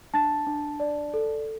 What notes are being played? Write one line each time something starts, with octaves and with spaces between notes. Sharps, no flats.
D4 A5 A6
D4
D5
A4